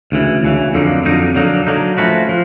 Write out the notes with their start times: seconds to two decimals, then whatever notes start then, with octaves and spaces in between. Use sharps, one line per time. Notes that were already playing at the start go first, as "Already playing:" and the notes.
0.12 D2 C#3 E3
0.43 D2 C#3 E3
0.74 F2 D3 F#3 A#3 D#4
1.05 F2 D3 F#3 A#3 D#4
1.36 D3 F#3 A#3 D#4
1.67 D3 F#3 A#3 D#4
1.98 F3 A3 C#4 F#4 B4
2.29 F3